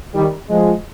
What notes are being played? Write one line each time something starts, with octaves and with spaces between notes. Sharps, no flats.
D#3 G3
F3 G#3